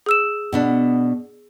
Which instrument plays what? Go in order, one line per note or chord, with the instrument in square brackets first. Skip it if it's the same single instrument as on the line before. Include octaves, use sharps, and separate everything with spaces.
[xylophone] G#4 E6 E7
[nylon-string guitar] B2 B3 D4